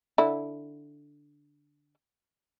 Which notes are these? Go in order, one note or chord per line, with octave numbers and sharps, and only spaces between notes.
D3 E4